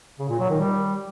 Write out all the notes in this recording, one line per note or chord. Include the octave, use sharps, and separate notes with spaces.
C#3
A#2
F#3
D#3
G3